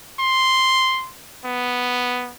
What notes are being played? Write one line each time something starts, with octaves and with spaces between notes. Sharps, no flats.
C6
B3